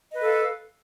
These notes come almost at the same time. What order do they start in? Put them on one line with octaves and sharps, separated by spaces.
D#5 B4 A4 F5